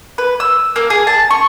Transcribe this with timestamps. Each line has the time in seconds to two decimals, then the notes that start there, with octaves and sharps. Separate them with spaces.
0.18 B4
0.40 E6
0.76 A#3
0.90 G#4
1.07 A5
1.31 C#6